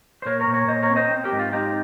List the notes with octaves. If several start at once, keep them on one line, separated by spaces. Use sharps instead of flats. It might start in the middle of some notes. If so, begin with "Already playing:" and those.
C5
A#2 A#4 C#5
A#4 C#5
A#2
A#4 C#5
A#2 C5 D#5
A#4 C#5
C4
C5 D#5
C4
G4 A#4
G#2
F4
C4 D#4 G4